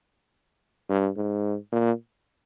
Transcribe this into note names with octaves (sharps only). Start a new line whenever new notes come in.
G2
G#2
A#2